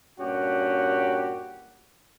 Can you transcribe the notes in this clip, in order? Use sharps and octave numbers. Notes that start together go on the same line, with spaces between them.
G2 A#2 C#4 F#4 G4 F#5